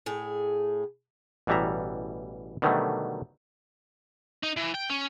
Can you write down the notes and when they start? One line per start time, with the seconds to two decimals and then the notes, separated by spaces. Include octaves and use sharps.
0.06 A2 G#4
1.47 A1 B2 E3 G3 E5 A#5
2.62 B2 D3 D#3 F#3 G3 A3
4.43 D#4
4.57 E3
4.74 G5
4.90 C#4